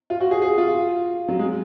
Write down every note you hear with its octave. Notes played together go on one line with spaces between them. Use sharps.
F4
F#4
G#4
G#4
F4
F#3
G#3